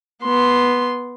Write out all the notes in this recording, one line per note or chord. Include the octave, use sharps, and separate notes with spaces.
B3 C6